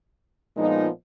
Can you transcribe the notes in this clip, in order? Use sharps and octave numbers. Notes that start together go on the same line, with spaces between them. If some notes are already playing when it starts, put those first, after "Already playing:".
A#2 F3 G#3 B3 D#4